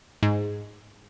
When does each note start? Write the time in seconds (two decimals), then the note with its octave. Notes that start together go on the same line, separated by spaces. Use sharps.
0.23 G#2